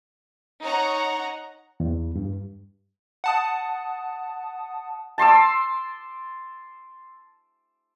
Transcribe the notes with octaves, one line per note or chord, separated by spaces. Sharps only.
D#4 C#5 F#5 A#5
E2
G2
F#5 A5 D#6
A5 C6 D6 E6